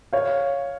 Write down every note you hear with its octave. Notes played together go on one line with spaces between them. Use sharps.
C#5 F5